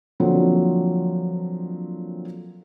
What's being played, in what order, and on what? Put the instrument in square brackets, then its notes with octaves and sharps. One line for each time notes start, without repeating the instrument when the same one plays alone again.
[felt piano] D3 F3 F#3 A#3 C4 A4